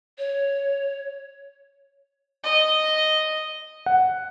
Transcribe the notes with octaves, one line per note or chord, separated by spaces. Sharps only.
C#5
D#5
F#5